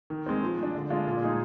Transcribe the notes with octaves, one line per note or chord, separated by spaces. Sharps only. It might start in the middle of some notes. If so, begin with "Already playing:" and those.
D#3
G#3 C4
F3
G#3 D4
D3
G#3 D4 F4
A#2
G#3 D#4 G#4